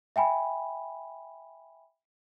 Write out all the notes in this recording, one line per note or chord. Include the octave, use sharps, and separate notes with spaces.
E5 G5 G#5 B5